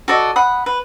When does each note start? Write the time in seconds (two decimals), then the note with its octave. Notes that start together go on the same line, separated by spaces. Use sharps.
0.08 F#4 A4 D5 D#5
0.36 F#5 B5 D#6
0.66 B4